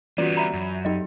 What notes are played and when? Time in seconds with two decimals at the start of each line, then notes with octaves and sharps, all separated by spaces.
0.18 E3 G3 B3 C#4 F4 F#4 D5
0.37 E5 A#5 B5
0.53 F#2
0.85 F#3 D#4 G4 D#5 G5